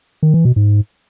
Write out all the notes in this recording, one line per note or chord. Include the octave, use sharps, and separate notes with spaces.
D#3
E3
B2
G#2